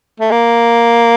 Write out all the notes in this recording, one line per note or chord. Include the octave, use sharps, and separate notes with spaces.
A3
A#3